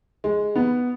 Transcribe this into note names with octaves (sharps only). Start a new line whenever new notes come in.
G#3
B3